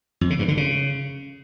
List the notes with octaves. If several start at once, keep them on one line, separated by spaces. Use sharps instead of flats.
F2
C#3
G2
D3
C#3